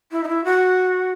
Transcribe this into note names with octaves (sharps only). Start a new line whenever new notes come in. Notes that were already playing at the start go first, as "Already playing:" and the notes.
E4
D#4
E4
F#4